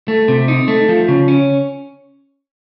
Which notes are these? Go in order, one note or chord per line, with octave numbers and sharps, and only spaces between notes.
A3
C3
D#4
A3
F3
C#3
C#4